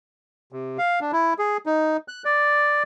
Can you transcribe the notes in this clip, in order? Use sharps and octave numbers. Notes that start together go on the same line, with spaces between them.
C3
F5
D4
E4
G#4
D#4
F#6
D5